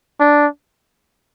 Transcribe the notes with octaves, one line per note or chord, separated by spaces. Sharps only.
D4